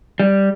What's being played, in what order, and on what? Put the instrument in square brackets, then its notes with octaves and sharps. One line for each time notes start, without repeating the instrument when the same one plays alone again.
[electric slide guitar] G3